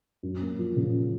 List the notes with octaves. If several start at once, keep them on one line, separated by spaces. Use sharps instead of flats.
F#2
A#3
F3
C#3